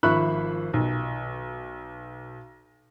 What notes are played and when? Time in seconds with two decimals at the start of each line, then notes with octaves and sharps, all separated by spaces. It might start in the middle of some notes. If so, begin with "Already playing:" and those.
0.03 G#1 F3 E5 B5 C#6 F#6
0.74 B1